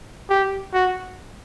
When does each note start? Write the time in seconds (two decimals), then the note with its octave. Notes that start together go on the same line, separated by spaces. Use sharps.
0.30 G4
0.74 F#4